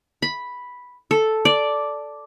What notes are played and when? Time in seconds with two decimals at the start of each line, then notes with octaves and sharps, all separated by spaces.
0.22 B5
1.11 A4
1.45 D5